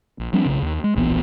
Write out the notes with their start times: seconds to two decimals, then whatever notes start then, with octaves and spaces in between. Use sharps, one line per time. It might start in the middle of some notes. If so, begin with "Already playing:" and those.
0.20 A#1
0.33 F3 G3 C4 D4
0.46 B1 C#3
0.62 D#2
0.84 G#3
0.96 D1 A#1 E3 B3